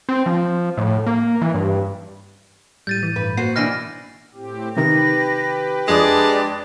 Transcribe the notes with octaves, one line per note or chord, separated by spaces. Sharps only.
C4
F3
A2
A#3
E3
G2
A2 G3 G6 A6 D#7
E3
G2 B4
A#3 F#4 C5 C7
B2 E3 D4 F6 A#6 D#7
A2 C4 G4
C3 D#3 G4 B4 A#6
F2 G#3 D4 D#6